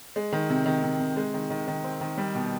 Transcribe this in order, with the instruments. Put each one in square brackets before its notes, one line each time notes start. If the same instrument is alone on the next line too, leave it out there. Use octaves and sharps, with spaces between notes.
[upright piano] G#3
D#3
C3
D#3
C3
C3
G#3
D#3
D#3
D#3
C4
D#3
G3
B2